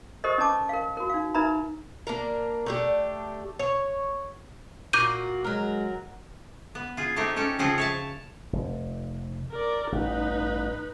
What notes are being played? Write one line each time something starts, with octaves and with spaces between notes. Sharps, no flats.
G4 A4 A#4 C5 D#5
C#4 B4 D#5 A5 D6
A#4 F5
F#4 A#4
D#4 F5
D#4 A#4 B4 E5 A#5 B5
A#3 D4 A#4
A3 D4 G4
C#5
A#2 A#3 F#4 D6 G6 D#7
F#3 G#3 A#4
B3
F4 G#4
A3 C4 D#4 G4
C#4 G4 A4
C#3 F3 C4 G#4 F#5
C#5 E5 A5
F1
A#4 D5
A1 G2 D#4 B4